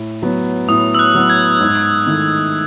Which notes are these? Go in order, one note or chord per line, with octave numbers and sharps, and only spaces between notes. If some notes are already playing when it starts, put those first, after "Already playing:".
Already playing: A2
F#3 B3
A2 D#6
E6
F#6
F#3 B3
G#6
G#2
D#3 A3 E4